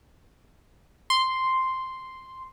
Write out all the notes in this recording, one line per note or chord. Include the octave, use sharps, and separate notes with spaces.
C6